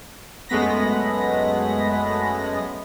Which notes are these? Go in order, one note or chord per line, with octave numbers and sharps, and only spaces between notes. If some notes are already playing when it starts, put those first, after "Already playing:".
F#2 G#3 A3 B3 B5 A#6